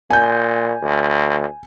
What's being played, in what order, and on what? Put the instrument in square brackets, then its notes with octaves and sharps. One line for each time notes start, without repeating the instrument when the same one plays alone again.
[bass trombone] A#2 [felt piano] G#5 G6
[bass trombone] D2